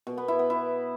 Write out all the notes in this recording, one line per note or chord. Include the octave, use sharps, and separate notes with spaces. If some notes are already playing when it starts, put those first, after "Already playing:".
B2
B3
E4
B3
E4